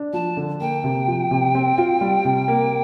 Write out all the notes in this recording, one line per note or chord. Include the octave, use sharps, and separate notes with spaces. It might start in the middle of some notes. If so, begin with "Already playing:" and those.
Already playing: D4
F3 A5
D3
A#3 G5
C3
F3
C3
C4
F4
G3
C3
A#3